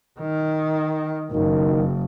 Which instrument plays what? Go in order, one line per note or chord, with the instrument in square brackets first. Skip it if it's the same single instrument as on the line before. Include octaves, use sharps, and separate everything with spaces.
[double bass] D#3
[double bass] F#1 [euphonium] D#3